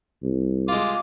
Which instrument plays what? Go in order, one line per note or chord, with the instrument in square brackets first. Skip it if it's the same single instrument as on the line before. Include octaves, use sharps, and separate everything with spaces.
[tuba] C2
[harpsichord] G#3 F4 [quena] D6